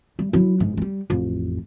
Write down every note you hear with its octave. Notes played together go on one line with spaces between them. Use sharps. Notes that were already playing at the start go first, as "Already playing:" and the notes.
G3
F#3 E4
G1 G#2
G3 G#3
A1 F2